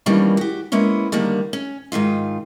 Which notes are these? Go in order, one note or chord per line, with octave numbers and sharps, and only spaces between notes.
D#3 E3 G3 A#3 C#4 D4
F#4 G4
G#3 A#3 B3 C#4 E4
D3 D#3 G3 A#3
C#4
G#2 D#3 D#4 F4